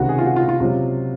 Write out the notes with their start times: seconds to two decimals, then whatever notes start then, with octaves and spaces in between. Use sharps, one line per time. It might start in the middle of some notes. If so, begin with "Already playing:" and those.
Already playing: C#2 C3 D#3 F#4
0.09 G#4
0.19 F4
0.26 F#4
0.36 F4
0.49 F4
0.60 C#2 C3 F#3 F4